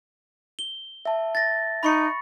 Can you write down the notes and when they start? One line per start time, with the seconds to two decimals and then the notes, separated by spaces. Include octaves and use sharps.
0.59 G7
1.05 E5 A5
1.35 A6 A#6
1.83 D#4 B5 C#6 C#7